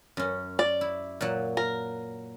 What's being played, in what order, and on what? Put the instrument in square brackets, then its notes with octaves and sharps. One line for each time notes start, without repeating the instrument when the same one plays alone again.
[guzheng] F#2 C#4
[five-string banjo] D5
[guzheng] E4
A#2 F#3
[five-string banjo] A#4